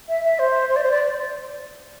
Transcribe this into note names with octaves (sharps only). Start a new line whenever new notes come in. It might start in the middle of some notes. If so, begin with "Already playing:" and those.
E5
E5
C5
C5
D5
C5
D5